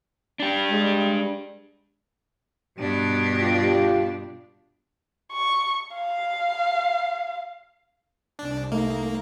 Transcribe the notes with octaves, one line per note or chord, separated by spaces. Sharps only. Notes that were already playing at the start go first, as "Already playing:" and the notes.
D4 G4
G3 G#3
G2 B2 D4
F4 G4
C#6
F5
C2 D4
A3 A#3 D#4